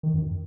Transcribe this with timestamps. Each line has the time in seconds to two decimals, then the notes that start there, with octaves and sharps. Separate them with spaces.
0.03 D#3
0.14 F#2